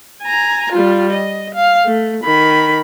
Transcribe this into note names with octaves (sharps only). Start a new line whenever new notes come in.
G#5 A#5
G3 F4
D#5
F5
A3
D#3 B5